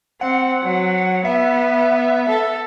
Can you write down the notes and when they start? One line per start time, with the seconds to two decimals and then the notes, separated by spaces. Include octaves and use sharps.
0.21 C4 F#5
0.63 F#3
1.25 B3 E5
2.29 A4